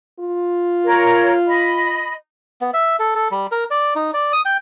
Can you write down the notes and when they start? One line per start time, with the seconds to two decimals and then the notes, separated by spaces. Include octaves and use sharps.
0.19 F4
0.84 A#4 C#5
1.48 D#5 B5
2.61 B3
2.74 E5
2.99 A4
3.15 A4
3.31 G3
3.52 A#4
3.71 D5
3.95 D#4
4.14 D5
4.33 D#6
4.45 G5